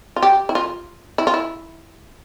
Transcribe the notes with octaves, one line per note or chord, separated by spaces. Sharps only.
F4
G4
E4
F4
E4
F4
E4